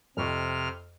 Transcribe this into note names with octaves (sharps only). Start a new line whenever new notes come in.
F2 C3 C#6 F6